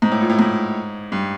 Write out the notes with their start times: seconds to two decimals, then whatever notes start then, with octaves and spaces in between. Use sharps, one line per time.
0.02 G#2
0.11 A2
0.21 A#2
0.29 A2
0.39 G#2
1.12 G2